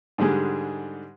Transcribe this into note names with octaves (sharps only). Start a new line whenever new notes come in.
G#2 D3 G3 G#3